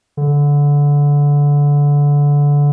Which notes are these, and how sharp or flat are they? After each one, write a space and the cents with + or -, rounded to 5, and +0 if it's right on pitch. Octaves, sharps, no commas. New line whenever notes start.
D3 -20